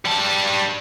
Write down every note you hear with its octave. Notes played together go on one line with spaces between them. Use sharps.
G3 A5